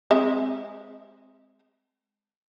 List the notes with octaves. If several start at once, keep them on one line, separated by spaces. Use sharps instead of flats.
G#3 C4 E5